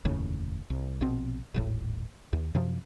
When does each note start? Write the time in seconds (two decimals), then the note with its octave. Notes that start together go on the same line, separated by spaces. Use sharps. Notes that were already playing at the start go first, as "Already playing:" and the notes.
0.05 F1 D#2 A2 C#3
0.70 C2
1.01 A#1 B2 C4
1.54 D#1 G#1 A2
2.33 D#2
2.55 F#2 C3 F3